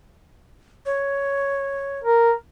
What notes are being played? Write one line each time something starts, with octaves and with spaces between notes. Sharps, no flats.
C#5
A#4